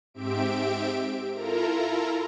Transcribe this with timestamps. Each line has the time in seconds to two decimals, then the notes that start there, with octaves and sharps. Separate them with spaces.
0.14 G#2 C4 G4 E5 D7
1.33 E4 F4 A4 A#4 A#5